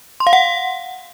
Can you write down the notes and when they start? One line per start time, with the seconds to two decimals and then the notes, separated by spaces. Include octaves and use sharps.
0.20 C6
0.27 F5
0.33 F#5